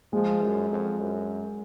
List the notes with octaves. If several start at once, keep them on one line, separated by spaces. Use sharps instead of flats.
F3 G#3
F#2
F2
F#2